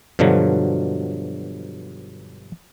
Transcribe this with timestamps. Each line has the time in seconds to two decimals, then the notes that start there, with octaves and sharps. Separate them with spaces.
0.19 G2 B2 D3 F3 F#3